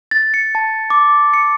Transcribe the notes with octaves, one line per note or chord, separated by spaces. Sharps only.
A6
C#7
A5
D6
C#7